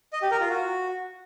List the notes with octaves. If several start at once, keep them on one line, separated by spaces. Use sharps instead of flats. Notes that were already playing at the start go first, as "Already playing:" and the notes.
D#5
G4
A#4
F4
F#4